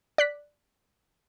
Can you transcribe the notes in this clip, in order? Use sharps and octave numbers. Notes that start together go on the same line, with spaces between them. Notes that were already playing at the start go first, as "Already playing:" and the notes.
D5 F#6 B6